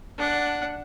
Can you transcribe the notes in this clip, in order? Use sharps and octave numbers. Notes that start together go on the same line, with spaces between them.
D4 F#5